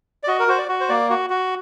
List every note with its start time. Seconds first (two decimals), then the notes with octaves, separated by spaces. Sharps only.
0.23 D5
0.28 F#4 D#5
0.39 A#4
0.48 F#4 C5
0.58 D5
0.69 F#4
0.80 C5
0.89 A#3 D5
1.10 F#4
1.30 F#4